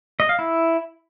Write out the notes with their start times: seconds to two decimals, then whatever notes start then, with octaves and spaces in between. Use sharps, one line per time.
0.20 D#5
0.29 F5
0.39 E4